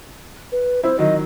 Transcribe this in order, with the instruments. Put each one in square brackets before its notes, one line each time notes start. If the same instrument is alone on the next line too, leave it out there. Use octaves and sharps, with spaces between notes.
[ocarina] B4
[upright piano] C4 E4 [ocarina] C5
[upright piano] D#3 F#3 [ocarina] D#5